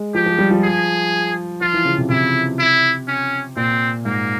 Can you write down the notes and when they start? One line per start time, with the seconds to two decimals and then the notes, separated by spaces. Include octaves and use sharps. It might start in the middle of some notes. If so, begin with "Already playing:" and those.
Already playing: G#3
0.14 F3 G4
0.26 F3
0.39 G3
0.51 F3
0.63 G#4
1.61 F3 F4
1.73 E3
1.85 C#3
1.98 C3
2.09 C3 E4
2.59 E4
3.08 C#4
3.56 A#2 C4
4.05 G#2 A#3